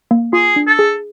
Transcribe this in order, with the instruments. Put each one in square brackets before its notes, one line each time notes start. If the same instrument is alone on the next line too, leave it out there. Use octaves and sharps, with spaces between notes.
[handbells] A#3
[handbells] F4 [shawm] G#4
[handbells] D4
[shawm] A4
[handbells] G#4